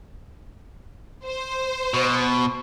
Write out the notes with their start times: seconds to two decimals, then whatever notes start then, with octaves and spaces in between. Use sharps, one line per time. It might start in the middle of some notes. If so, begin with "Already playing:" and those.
1.26 C5
1.94 B2